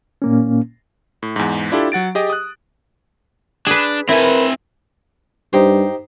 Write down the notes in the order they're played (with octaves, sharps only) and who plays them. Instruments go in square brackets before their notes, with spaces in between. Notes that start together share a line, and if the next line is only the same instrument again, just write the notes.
[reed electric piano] A#2 A#3 C#4
[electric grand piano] A2
E2 G#2
D4 E4 F4 G4 A4
F#3 F#5 A6 D7
G4 G#4 D#5
D#6 F#6
[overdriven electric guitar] D4 [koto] G#4 B4
[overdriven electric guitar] C4 G#5 [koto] E4 [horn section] A#4 B4
[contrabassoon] G2 [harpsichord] D#4 G4 C5